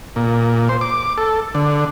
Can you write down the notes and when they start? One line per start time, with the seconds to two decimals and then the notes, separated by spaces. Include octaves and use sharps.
0.16 A#2
0.69 C5
0.81 D6
1.18 A4
1.55 D3